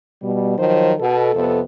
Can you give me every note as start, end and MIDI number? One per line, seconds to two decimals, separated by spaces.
0.22 0.56 47
0.22 0.56 55
0.59 0.94 51
0.59 0.94 53
0.59 0.94 54
0.59 0.94 72
1.00 1.33 47
1.00 1.33 69
1.35 1.61 41
1.35 1.61 48
1.35 1.61 59
1.35 1.61 69